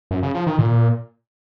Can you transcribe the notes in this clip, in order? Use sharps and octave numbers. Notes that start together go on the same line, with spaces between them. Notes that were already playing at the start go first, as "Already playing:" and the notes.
F#2
C#3
F3
D#3
A#2